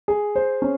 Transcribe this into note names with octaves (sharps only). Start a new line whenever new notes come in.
G#4
C5
C#4